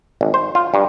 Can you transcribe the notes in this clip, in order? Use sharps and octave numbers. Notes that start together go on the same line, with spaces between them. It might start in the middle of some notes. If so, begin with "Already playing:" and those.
G#1
C5
F4
G2